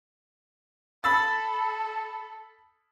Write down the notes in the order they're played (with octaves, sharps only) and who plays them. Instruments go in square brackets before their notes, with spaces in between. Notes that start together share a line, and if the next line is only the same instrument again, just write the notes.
[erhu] A4 [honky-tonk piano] B5 E6 A6